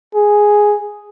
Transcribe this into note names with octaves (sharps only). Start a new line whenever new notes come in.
G#4